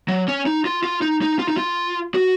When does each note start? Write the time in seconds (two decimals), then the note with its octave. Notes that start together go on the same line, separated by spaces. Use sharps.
0.08 F#3
0.28 C#4
0.46 D#4
0.65 F4
0.84 F4
1.02 D#4
1.22 D#4
1.39 F4
1.48 D#4
1.57 F4
2.14 F#4